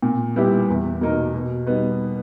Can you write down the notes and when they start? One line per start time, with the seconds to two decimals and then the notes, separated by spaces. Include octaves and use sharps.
0.02 A#2
0.36 G3 B3 E4 G4
0.69 E2
1.01 B2 A#3 D#4 A#4
1.33 B2
1.66 G3 B3 D#4